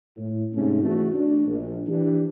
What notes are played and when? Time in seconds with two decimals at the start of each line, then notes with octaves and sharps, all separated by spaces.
0.16 A2
0.54 G#2 C3 A3 C4 C#4 D#4
0.83 E2 A3 F#4
1.13 D4
1.47 A#1
1.87 E3 D4 G4